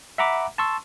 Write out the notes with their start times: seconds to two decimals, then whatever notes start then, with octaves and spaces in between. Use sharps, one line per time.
0.18 E5 F#5 A#5 B5 D6
0.58 A5 C6 C#6 E6